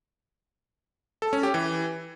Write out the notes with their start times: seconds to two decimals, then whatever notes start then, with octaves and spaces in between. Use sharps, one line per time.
1.22 A4
1.33 C#4
1.43 G4
1.54 E3